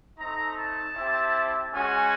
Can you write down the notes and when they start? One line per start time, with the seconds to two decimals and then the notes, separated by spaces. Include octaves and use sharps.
0.19 A3 C4 D#4 A#5
0.57 A5
0.96 C4 E4 G4
1.73 G#3 C#4 F#4 G#5